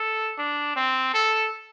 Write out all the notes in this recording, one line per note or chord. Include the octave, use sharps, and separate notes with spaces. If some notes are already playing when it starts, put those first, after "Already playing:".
Already playing: A4
D4
C4
A4